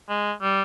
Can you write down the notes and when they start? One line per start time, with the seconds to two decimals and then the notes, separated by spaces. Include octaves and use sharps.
0.09 G#3
0.42 G3